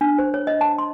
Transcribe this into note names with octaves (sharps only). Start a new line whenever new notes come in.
D4
C5
C#5
D#5
A5
C6